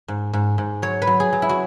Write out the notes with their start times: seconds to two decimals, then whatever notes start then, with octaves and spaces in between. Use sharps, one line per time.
0.08 G#2
0.33 G#2
0.58 G#2
0.82 F#3 C#5
1.02 B4
1.07 F#3
1.20 G#4
1.33 F#3
1.42 E4
1.49 F#4